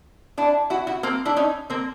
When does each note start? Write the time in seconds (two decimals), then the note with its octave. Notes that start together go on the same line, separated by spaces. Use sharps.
0.38 D4 E4
0.70 E4 F#4
0.87 E4 F#4
1.03 A#3 C4
1.25 D4 E4
1.37 C#4 D#4
1.70 A#3 C4